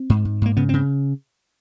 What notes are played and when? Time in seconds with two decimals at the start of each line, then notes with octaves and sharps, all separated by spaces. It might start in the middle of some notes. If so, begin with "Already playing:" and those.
Already playing: C4
0.10 G#2
0.25 G#2
0.42 G#2 A#3
0.57 C#3 B3
0.69 C#3 C4